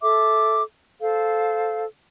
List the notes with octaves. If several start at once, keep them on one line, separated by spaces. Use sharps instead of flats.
A4 E5 D6
A4 C5 F5